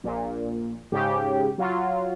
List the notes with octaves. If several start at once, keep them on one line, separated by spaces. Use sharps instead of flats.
A#1 A#2
G#2 C#3 G4
F#3 F4